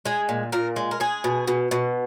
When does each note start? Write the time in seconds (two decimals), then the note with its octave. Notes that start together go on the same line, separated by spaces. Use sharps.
0.05 G#3 G#4
0.29 A#2
0.52 A#2 A#4
0.76 G#3
0.91 A#4
1.00 G#3 G#4
1.24 B2
1.48 B2
1.71 B2